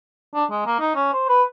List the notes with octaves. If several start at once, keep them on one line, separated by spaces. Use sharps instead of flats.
D4
G#3
A#3
D#4
C#4
C5
B4